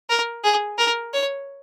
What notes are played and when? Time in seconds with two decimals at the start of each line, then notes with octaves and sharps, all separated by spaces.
0.10 A#4
0.44 G#4
0.78 A#4
1.13 C#5